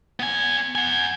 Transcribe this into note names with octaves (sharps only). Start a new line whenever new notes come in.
B3 G#5
F#5 G#5